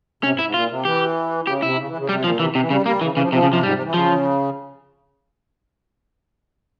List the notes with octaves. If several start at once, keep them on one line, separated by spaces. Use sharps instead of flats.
C3 C#4
G#2
E4
G#2
A#2 F4
C3
E3 G4
C#3 G4
C3 E4
C#3
E3
C#3
C3 G3
A#2 F3
C3 E3
C3
E3
C#3 G3
G3 A#3
C#3 E3
E3
C#3
F3
C3 F3
C#3
C3
F3
G#2 G3
C3
E3
C#3 F3